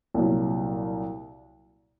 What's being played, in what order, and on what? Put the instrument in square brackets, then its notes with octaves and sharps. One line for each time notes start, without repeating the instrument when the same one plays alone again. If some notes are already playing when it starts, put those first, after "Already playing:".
[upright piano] C2 A#2 F#3